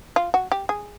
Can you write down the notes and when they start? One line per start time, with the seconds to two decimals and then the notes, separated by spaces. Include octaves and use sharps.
0.16 F4
0.34 F#4
0.52 G4
0.69 G#4